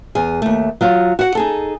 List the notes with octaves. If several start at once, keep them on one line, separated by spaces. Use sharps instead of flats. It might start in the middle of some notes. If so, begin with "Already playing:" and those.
E2 G#4
D#2 A3
F#3 F4 C#5
F#4 F#5
D#4 G#4 A4